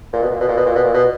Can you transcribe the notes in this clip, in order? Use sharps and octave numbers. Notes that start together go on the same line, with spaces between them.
A#2
B2
A#2
B2
A#2
B2
A#2
B2
A#2
B2